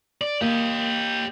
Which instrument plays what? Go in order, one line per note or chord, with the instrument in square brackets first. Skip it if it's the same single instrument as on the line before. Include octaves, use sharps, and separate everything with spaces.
[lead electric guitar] D5
[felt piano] A#3 [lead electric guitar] G4 D#5